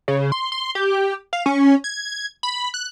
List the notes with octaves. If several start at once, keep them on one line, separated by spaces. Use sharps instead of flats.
C#3
C6
C6
G4
F5
C#4
G#6
B5
F#6